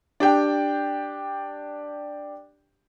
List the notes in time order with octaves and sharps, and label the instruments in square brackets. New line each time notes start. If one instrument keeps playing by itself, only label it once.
[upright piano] D4 G4 G5